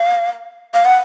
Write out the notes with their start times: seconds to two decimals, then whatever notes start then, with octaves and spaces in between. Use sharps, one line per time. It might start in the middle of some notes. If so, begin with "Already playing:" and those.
Already playing: F5
0.74 F5
0.85 F#5